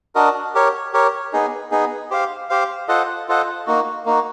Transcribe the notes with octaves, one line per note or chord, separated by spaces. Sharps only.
D4 F#4 A#4 D#5
G4 A#4 C#5
G4 A#4 C#5
B3 D#4 G#4
B3 D#4 G#4
G4 C5 F5
G4 C5 F5
F4 A4 C5 D#5 F#5
F4 A4 C5 D#5 F#5
A#3 D#4 F#4
A#3 D#4 F#4